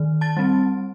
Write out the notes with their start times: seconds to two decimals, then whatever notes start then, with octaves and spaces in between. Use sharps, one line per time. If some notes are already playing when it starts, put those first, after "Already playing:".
Already playing: D#3
0.21 A5 A6
0.37 G3 C4